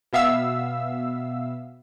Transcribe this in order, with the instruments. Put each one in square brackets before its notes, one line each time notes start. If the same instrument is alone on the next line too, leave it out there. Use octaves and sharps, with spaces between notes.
[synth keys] B2 B3 E5 F5 E6